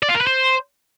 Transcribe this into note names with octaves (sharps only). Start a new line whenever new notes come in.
D5
F4
A#4
B4
C5